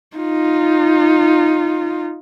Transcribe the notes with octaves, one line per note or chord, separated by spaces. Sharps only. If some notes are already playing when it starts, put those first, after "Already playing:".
D#4 F4